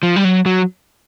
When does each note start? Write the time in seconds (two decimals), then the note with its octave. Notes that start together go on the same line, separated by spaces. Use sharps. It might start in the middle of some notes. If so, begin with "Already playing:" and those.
0.03 F3
0.16 G3
0.24 F#3
0.46 F#3